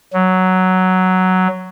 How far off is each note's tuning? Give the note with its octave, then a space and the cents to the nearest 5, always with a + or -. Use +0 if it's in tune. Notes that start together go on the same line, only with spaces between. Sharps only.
F#3 +5